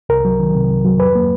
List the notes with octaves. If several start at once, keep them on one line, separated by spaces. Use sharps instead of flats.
C2 A#4
F#3
D#3
C3
C2
F#3
F2 B4
A#3